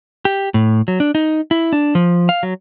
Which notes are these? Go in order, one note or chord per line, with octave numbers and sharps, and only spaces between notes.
G4
A2
F#3
D4
D#4
E4
D4
F3
F5
F#3